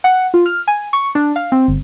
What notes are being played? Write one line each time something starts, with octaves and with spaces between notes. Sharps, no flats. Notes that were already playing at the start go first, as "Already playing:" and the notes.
F#5
F4
F6
G#5
C#6
D4
F5
C4
G1